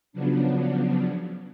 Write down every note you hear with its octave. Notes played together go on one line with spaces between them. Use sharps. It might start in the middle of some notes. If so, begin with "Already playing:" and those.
C#3 F3 F#3 B3 D4